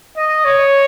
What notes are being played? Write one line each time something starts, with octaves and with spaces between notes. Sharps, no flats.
D#5
C#5